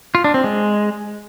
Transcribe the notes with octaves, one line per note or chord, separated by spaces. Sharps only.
F4
D4
C4
G#3